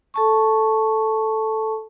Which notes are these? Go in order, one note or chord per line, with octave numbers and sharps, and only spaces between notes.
A4 A5 C#6